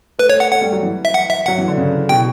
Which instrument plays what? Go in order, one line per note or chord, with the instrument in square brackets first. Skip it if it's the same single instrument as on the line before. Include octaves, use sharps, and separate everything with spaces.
[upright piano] A3 [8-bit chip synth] B4
[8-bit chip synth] C#5
F#5
[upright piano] A3 [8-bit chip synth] F#5
[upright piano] G3
F#3
E3
[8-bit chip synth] E5
F#5
E5
[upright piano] F#3 [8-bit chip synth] F#5
[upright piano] E3
D3
C#3
[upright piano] B2 [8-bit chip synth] G5